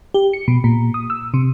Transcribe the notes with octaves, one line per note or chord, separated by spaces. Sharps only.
G4
C#7
B2
A#2
D#6
E6
C3